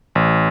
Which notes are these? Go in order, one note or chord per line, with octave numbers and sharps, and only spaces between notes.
A1